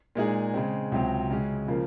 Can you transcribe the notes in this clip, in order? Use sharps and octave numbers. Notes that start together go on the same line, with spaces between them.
A#2 G#3 D#4 G#4
C#3 G#3 C4
C#2 C3 F#3 C4
C#3 G#3 C#4
C#3 F3 A#3